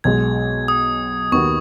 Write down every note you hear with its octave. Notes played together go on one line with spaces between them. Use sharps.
B1 B2 G#3 G#6
D#6
D#2 D#3 B3 F#4 C#6